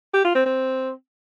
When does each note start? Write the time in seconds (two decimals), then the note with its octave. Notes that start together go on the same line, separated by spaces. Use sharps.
0.14 G4
0.25 F4
0.35 C4
0.46 C4